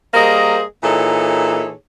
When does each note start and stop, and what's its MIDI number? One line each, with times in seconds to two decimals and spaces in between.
0.14 0.62 55
0.14 0.62 58
0.14 0.62 68
0.14 0.62 70
0.14 0.62 72
0.14 0.62 75
0.83 1.72 46
0.83 1.72 52
0.83 1.72 63
0.83 1.72 68
0.83 1.72 69
0.83 1.72 73